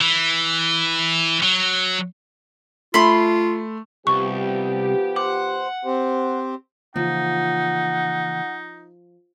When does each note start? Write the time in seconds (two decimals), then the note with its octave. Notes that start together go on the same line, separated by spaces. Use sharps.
0.01 E3
1.43 F#3
2.94 A3 F4 B5 C6
4.07 C2 F3 B3 G4 C#6
5.16 C5 F#5 D6
5.85 C4 G4 C5
6.96 C#3 E3 F3 A#3 D#4 F#5